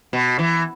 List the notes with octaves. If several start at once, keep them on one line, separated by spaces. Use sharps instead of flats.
B2
E3